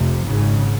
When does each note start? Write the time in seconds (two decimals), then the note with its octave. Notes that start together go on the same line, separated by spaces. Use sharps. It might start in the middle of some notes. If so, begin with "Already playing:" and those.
Already playing: F1 F2 C3
0.28 G#1 G#2 C#3